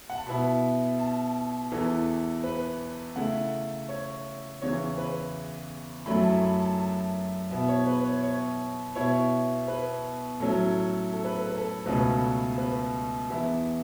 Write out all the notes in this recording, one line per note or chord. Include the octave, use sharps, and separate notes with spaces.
F#5
A5
B2 B3 E4 B5
A5
E2 E3 B3 A4
B4
C#3 A3 E4 F#5
C#5
E2 C#3 E3 C#5
B4
F#2 F#3 A3 E4 B5
A5
B5
A5
A5
B2 B3 E4 E5
C#5
B4
C#5
C#5
B2 B3 E4 C#5
B4
A2 F#3 C#4 E4 A4
A4
B4
A4
B4
A4
C#2 B2 A3 C#4 B4
B4
E2 E3 B3 E4 E5